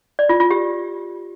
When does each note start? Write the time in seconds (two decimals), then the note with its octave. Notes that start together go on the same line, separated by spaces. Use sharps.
0.19 D5
0.29 F4
0.40 F4
0.51 G4